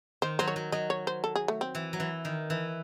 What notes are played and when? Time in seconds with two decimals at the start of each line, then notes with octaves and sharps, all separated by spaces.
0.22 D#3 C5
0.39 F#3 C5
0.48 C#5
0.56 F#3
0.72 F#3 D#5
0.90 C#5
1.07 C5
1.24 A4
1.36 G#4
1.48 A3
1.61 C4
1.75 E3
1.93 F#3
2.00 E3
2.25 D#3
2.50 E3